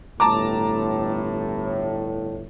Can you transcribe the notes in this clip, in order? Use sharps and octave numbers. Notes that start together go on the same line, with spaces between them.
G1 A2 A5 A#5 D6